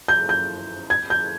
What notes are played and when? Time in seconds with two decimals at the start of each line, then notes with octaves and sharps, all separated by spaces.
0.08 G6
0.29 G6
0.90 G#6
1.10 G6